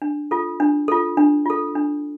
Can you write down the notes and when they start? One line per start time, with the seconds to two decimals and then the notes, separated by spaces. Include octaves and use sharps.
0.02 D4
0.31 F4 A4
0.60 D4
0.88 F4 A4
1.17 D4
1.46 F4 A4
1.75 D4